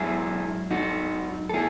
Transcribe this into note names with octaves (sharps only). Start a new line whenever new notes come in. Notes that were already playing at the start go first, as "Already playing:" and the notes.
Already playing: G#2 F#3 E4 G#4
D#4 F#4
A4
E4 G#4